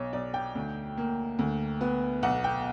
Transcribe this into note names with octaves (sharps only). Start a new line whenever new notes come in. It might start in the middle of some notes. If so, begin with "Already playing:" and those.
Already playing: B1 C#5
B1 D5
G5
D2
A#3
D2
B3
B1 F#5
G5